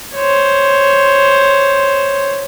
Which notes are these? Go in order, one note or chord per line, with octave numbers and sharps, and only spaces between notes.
C5 C#5